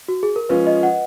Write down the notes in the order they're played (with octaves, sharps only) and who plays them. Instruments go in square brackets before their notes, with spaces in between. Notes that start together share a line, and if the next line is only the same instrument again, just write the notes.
[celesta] F#4
G#4
A#4
[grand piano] F3 G#3 C#4 F4 [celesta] B4
[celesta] D#5
F#5